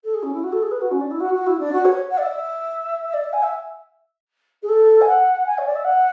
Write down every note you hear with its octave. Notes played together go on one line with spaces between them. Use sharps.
A4
G#4
C#4
E4
F#4
A4
G#4
B4
F#4
C#4
D4
E4
F#4
F#4
E4
D4
F#4
C#5
F#5
D5
E5
D5
E5
G#5
E5
G#4
A4
G#5
F#5
G#5
C#5
D5
E5
F#5